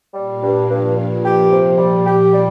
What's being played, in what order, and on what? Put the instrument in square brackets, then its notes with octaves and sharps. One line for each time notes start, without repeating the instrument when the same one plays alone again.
[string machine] A#2 A#3 [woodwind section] G3
[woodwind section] G2
[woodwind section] G2 [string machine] F3
[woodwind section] G2
G4
C3
G3
G4
G3